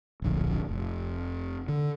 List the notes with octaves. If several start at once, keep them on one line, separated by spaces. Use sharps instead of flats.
D1 A#1 D3
F1
D3